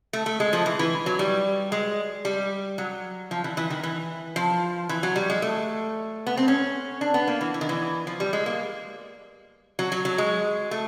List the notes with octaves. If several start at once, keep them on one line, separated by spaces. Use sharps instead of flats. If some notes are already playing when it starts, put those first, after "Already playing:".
A3
A3
G#3
F3
E3
E3
F#3
G3
G#3
G3
F#3
F3
E3
E3
D#3
E3
F3
E3
F#3
G3
G#3
A3
B3
C4
C#4
D4
B3
A#3
E3
E3
D#3
E3
F3
G3
G#3
A#3
F#3
F#3
F#3
G#3
A3